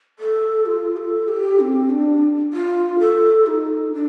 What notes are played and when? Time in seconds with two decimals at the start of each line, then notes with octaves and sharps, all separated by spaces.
0.19 A4
0.66 F4
0.97 A4
1.28 G4
1.60 C4
1.90 D4
2.53 F4
2.99 A4
3.46 D#4
3.93 D4